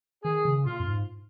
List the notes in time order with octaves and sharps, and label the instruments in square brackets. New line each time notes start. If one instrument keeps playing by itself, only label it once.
[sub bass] D#3 [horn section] G#4
[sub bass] C#3
[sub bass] A#2 [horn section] F4
[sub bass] F2
G#2